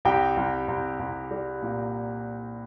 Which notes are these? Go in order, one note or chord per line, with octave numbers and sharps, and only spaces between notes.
C2 G4 G5
C2
C2
C2
G3
A#2